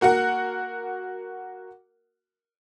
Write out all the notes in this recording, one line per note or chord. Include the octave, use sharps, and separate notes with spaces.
A#3 F#4 A#4 F#5